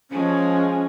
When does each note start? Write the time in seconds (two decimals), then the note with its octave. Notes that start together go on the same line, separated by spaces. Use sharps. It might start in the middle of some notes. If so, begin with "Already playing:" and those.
0.10 F3 G#3 C#4